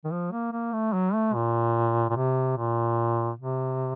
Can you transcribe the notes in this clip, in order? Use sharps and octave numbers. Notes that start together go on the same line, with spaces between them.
D#3
F3
A#3
A#3
A3
F#3
A3
A#2
A#2
C3
A#2
C3